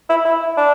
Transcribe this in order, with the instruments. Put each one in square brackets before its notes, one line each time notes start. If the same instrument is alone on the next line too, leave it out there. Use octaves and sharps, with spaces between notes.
[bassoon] E4
E4
D4